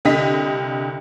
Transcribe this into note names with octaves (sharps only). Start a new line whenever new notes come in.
C2 D3 D#5 B6